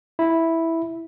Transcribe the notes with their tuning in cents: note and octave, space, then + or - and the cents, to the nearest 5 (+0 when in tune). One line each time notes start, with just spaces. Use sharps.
E4 -5